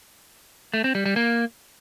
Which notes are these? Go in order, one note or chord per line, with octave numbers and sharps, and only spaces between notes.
A3
C4
G3
G3
A#3